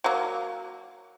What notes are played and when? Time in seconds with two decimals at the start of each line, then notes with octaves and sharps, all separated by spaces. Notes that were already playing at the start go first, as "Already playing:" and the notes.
0.04 F#3 A#3